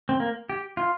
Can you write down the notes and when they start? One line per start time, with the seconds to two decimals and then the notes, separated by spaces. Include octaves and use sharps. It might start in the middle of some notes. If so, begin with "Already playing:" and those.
0.09 C4
0.20 A#3
0.49 G4
0.77 F4